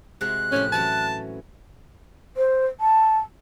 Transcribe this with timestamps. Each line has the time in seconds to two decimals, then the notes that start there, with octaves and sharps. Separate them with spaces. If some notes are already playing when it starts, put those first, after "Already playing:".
0.21 C3 G#3 F#4 F#6
0.52 A2 F3 C#4 G4
0.72 E3 F#3 C#4 A5
2.37 C5
2.80 A5